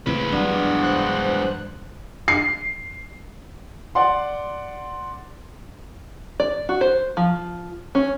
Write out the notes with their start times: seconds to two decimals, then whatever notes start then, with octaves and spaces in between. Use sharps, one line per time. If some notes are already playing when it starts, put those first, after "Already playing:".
0.06 A1 C#3 G#3 C4 B4
0.32 G2 E3 F#3 B3 D4 D5
0.81 C5 F#6
2.28 C7
3.95 D5 F#5 C6
6.40 D5
6.69 F#4
6.81 C5
7.17 F3
7.95 C#4